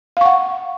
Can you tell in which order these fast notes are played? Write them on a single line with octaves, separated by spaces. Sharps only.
F5 C#6 F#5